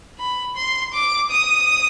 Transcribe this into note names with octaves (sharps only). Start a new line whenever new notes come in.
B5
C6
D6
D#6